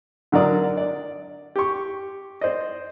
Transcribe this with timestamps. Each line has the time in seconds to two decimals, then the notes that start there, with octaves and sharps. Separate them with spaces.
0.32 D3 F#3 A#4 D5 D#6
0.77 D5
1.56 G4 C#6
2.41 C5 D5 D#5